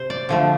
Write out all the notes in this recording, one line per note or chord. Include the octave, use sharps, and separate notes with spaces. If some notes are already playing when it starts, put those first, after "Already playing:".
Already playing: C3 C4 C5
D5
D3 F3 A3